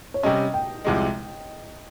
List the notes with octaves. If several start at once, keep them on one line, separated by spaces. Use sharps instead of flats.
C#5
C3 G3 C#4 D#5
G5
C2 C3 F3 G#3